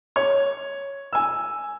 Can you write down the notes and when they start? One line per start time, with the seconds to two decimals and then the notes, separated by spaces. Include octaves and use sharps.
0.16 C#5
1.13 G#5 E6